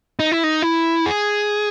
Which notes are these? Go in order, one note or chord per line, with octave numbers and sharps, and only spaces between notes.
D#4
E4
D#4
E4
G#4